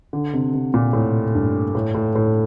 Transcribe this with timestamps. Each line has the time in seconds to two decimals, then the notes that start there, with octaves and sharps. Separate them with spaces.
0.13 D3
0.33 C3
0.54 C3
0.74 A#2
0.93 A2
1.35 G2
1.75 A2
1.95 A2
2.16 A2